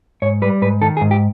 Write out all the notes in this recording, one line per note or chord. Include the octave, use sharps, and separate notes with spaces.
G#2 C#5
G3 B4
G#2 B4
D#3 A4
G#4
G#2
G4